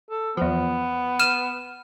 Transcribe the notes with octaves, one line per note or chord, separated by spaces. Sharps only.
A4
E2 F3 B3
F6 D#7 E7